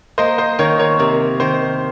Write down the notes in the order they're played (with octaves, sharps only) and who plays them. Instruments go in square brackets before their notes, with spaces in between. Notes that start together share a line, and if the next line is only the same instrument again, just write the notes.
[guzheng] A#3 [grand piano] C5 D#5
[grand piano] C5 D#5
[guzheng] D#3 [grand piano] A#4 C#5
[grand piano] A#4 C#5
[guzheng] C3 [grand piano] A#4
[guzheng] D#3 [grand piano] C5